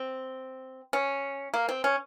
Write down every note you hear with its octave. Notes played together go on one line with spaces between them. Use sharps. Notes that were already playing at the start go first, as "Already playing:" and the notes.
Already playing: C4
C#4
A#3
C4
C#4